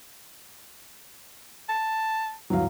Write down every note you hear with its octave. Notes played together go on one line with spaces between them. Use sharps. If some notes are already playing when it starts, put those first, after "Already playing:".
A5
D1 G2 E3 F#3 F5